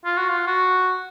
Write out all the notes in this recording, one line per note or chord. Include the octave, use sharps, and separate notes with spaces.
F4
F#4
F4
F#4